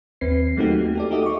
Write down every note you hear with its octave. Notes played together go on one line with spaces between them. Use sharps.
D#2 C4 B4 C7
F#3 A3 A#3 D#4 F#4 G4
A3
G4 A4 D5
D#4 F#4 G4 A4 D#5 E5
C#6 D6